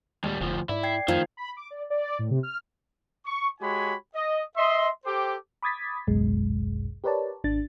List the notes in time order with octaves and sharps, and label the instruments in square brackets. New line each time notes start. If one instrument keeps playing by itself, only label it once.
[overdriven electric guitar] D#2 G3 [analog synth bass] G#3
[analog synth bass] F1 [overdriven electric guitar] D2 F3
[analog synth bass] G#2 [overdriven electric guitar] E4 [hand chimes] D5
[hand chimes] G5 G#6 C7
[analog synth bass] F#2 [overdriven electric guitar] D#3 [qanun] F3 [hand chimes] A3 G#6
[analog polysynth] B5
D6
D5
D5
A2
C3
F6
[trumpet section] C#6
G#3 F#4 G4 C#5 G#5 B5
D#5
D#5 E5 C6
G4 A4 C5 G5 D6
[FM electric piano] B5 D6 D#6 G#6 A6 B6
G#1 C#2 F#2 B2 G#3
G4 A#4 B4 C#5 D5 A5
G#1 D4 A6